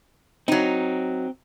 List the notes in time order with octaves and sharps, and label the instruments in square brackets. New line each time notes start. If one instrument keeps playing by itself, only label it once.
[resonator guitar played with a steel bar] F#3 D#4 [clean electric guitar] C4